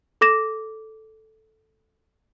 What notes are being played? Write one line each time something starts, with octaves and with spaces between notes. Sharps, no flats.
A4 D6 A#6 E7